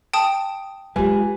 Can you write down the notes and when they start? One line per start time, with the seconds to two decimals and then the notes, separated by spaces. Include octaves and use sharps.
0.13 G5 A5 D#6
0.96 F#3 G#3 F4 G4 B4 G#5